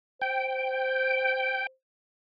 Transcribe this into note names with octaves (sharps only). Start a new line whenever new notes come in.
C5 G5